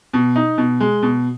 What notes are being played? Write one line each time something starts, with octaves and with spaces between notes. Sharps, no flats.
B2
D#4
B2
G#3
B2